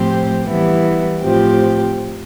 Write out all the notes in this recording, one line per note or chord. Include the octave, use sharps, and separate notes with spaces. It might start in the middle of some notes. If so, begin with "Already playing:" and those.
Already playing: A2 F3 C4 G4 C5
E3 G3 B3 E4
A2 F3 C4 G4